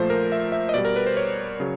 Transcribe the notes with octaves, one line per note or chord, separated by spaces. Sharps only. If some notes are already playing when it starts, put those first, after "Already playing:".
Already playing: A#2 F3 A3 C5
A#4
E5
E5
D#5
B2 G3 D5
A#4
B4
C5
C#5
C#3 F#3